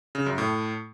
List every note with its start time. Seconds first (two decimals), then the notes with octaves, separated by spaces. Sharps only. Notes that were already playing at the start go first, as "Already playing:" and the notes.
0.15 C#3
0.26 F#2
0.38 A2